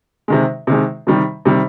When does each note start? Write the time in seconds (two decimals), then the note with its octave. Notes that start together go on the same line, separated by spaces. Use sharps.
0.28 C3 D#3 G#3
0.67 C3 D#3 G#3
1.07 C3 D#3 G3
1.45 C3 D#3 G3